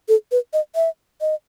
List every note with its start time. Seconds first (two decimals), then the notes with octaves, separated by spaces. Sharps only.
0.08 A4
0.32 B4
0.53 D#5
0.76 E5
1.21 D#5